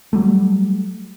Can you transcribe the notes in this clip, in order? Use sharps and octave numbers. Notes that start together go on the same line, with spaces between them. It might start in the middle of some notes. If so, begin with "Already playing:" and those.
F#3 G3 A3